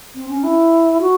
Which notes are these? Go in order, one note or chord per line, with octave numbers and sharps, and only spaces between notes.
C4
C#4
E4
F#4